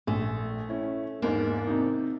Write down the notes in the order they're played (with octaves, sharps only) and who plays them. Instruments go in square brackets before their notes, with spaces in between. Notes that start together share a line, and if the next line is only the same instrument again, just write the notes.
[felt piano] A#1 [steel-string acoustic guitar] A3
[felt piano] C#4 E4
[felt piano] E2 G#2 [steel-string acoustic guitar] A#3 D4
[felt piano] C3 D#4